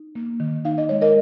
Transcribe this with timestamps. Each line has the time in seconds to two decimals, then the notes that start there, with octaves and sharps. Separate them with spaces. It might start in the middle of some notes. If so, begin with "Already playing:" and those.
Already playing: D#4
0.15 A#3
0.40 D#3
0.65 D#4 F5
0.78 D#5
0.89 G#3 C#5
1.02 A#4 D#5